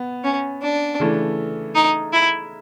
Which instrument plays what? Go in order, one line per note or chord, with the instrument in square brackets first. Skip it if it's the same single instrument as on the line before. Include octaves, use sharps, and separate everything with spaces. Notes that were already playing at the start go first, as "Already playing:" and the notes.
Already playing: [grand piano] B3
[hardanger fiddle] C#4
D4
[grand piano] C#3 E3 A3
[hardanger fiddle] D#4
E4